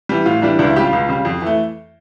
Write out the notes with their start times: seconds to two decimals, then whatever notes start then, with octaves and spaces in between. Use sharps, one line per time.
0.09 E3 G3
0.26 A2 F4
0.42 E3 G3 D4
0.59 C#2 D4
0.67 E4
0.76 C#3 G4
0.80 G3 F4
0.93 C#2
1.09 C#3 G3
1.25 F2
1.42 E3 A3